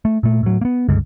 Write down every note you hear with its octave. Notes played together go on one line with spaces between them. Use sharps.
A3
A#2 A3
A2 F#3
A#3 B3
C#2 G2 D3 G#3